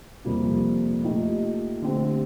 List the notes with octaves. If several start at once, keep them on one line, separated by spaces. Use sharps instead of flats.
F2 C3 G3 A#3
A#2 A3 D#4 G4
D3 A3 C4 G4